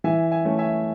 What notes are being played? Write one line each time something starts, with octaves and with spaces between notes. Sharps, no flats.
E3 E5 G#5
E5 G#5
A3 C#4
E5 G#5